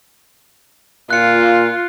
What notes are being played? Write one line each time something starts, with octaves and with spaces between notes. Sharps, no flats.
A#2 F4 F#6 C#7